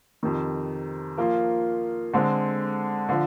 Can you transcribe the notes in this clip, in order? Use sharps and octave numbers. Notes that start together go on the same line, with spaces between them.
F2 C3 D#3
F3 A#3 F4
D3 G#3 C4
D3 F3